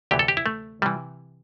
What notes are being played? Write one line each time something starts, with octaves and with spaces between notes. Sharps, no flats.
D2 C3 E3 G4
A4
G4
E4
A3
C3 E3 G3